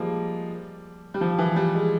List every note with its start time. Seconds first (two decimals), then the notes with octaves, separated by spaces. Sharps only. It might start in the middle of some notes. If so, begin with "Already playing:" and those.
Already playing: F3 G3 G#3 A#3
1.14 G3
1.21 F3
1.39 E3
1.56 G3
1.74 G#3